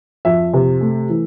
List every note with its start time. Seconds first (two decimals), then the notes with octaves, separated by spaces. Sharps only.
0.25 F2 E5
0.54 C3
0.81 A3
1.09 E3